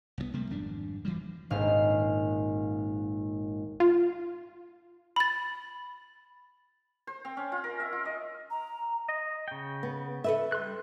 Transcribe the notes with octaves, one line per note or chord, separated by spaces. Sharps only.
C2 F3 B3
C3 G3 A3 A#3
G#1 F2 G3 D4
G2 E3 F#3 G3
D#1 G#1 F5 F6
F4
B5 A6
C5
C4
C#4
F4
A#4
E5
F4
D#5
A#5
D#5
C#3 G5
B3
A4 B4 E5
G3 C6 F#6